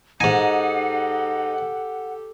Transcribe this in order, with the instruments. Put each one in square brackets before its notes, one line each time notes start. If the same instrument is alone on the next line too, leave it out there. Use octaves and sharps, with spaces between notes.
[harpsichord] G#2 G#5 [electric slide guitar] D#4 [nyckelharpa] G4 A4 [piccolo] F#5